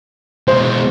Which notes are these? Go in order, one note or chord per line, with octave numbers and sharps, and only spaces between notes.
B2 G#3 C5